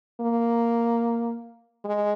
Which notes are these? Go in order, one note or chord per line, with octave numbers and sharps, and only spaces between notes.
A#3
G#3